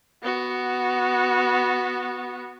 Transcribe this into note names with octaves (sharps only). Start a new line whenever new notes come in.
B3 F#4